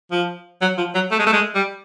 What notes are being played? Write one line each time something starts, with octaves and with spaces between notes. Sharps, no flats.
F3
F#3
F3
F#3
A3
G#3
A3
G#3
G3